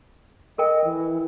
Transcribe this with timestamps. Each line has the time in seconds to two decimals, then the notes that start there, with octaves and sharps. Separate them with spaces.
0.58 A4 A#4 D#5 G5
0.84 E3